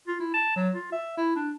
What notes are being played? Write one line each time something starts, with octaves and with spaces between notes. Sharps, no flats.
F4
E4
A5
F#3
F4
E5
E4
D4